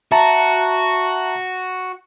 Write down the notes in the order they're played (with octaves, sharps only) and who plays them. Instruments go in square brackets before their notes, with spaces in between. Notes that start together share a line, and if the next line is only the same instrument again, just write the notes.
[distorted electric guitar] F#4 [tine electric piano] E5 A5 A#5